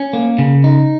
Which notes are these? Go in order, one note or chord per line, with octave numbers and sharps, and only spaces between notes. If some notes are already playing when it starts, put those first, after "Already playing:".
Already playing: C#4
A#3
C#3
D#4